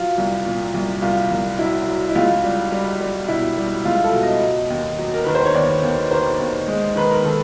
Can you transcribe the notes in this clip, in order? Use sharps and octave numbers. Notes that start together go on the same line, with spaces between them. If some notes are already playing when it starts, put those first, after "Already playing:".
Already playing: F#3 F4
C2
A#2
C2
C2 F4
C2
F#3 E4
F#3
E4
C#2 F4
G3
G3
G3
B2 E4
G3
C#2 F4
A4
B2
D#5
F#3
D#2
F#3
A#4
D#3 B4
C5
C#5
D#2 D5
D#2
D#3 C5
D#2
G#3
D#3 B4
A#4
D#3 A4